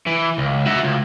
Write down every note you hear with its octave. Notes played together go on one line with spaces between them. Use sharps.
E3
C#2
F#4 E5
C#2